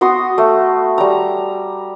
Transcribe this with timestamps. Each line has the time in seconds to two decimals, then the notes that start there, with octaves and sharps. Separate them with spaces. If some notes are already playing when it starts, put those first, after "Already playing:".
0.01 B3 F#4 C6 D#6
0.38 A3
0.98 G3 A#5